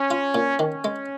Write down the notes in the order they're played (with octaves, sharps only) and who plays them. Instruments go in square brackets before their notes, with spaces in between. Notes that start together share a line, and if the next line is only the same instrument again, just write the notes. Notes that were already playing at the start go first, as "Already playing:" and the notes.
Already playing: [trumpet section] C#4
[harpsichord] F4
A#2
[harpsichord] D#3 [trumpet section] C#4
[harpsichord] G#3